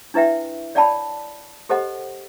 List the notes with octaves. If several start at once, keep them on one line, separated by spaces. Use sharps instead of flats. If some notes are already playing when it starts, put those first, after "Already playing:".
D4 E4 B4 E5 G5
C#5 D5 F5 G5 A5 B5
G4 A4 C5 D#5 F#5